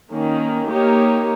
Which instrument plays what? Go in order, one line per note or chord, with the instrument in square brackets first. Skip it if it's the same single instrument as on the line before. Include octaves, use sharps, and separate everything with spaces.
[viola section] D#3 A#3 C#4
A#3 D#4 G4 A#4 C#5